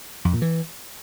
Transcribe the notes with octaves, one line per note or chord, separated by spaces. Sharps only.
F2
A#2
E3